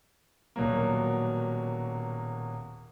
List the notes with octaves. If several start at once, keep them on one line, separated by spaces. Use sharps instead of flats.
D#1 B2 F#3 A#3